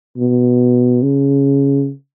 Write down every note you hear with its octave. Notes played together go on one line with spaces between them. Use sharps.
B2
C#3